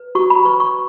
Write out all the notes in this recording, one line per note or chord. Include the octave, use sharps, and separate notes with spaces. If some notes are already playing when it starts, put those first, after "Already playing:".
Already playing: B4
F#4 C#6
B5
B4 C#6
C#6